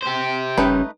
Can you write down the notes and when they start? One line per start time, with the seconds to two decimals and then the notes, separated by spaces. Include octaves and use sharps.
0.02 G4 C5
0.58 F#1 G3 A3 C#4 D#4 B4